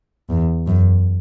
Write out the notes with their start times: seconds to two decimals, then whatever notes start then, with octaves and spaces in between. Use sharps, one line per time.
0.30 E2
0.67 F#2